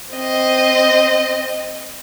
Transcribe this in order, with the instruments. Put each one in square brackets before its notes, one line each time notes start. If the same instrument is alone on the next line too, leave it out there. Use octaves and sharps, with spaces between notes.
[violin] C4 D#5